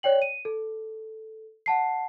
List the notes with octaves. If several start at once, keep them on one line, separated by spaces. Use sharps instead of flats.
C#5 D5 G5 F#7
D#7
A4
F#5 A5 C7